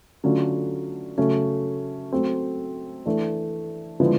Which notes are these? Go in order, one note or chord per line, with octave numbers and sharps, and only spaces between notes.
D3 F#3 A3 C#4 F4
C#3 F#3 A3 C#4
F#3 A3 C4
E3 A3 D4
D3 F3 G#3 B3 E4